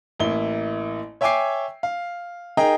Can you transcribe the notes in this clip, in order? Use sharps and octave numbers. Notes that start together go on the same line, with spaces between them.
A1 A#3 E4 G7
C#5 E5 G5 G#5 D6 C7
F5
D#4 G#4 A#4 D#5 G5 A#5